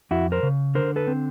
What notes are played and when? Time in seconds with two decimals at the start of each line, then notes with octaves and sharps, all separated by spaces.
0.11 F2 E4 F#4
0.32 A#4 C5
0.43 C#3
0.75 D3 A#4 C5
0.96 A4 B4
1.07 C4